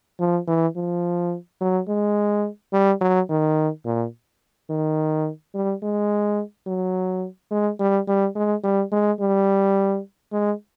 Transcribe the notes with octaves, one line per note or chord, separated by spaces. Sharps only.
F3
E3
F3
F#3
G#3
G3
F#3
D#3
A#2
D#3
G3
G#3
F#3
G#3
G3
G3
G#3
G3
G#3
G3
G#3